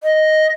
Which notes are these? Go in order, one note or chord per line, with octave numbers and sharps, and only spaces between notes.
D#5